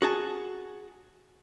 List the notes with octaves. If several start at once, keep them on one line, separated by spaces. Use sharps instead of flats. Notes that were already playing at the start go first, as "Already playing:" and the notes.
F#4 G#4 A5